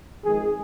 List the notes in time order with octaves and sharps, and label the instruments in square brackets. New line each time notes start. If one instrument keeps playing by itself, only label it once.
[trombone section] F2 D#3 G#3 G#4